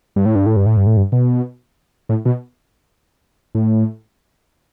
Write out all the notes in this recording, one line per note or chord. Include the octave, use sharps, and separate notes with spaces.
G2
A2
G2
A2
G2
A2
G2
A2
G2
B2
A2
B2
A2